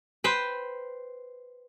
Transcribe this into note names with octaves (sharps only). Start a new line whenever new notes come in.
B4 C5 G5